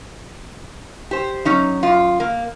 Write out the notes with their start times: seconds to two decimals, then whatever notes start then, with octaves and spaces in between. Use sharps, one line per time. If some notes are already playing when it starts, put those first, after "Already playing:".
1.11 G4 C5
1.45 F#3 C#4 D#4
1.83 F#2 F4
2.20 A#3